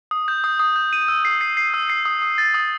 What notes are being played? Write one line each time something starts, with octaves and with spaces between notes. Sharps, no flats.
D#6
G6
D#6
D#6
G6
D#7
E6
C7
C7
C7
E6
C7
D#6
D#6
A6
D#6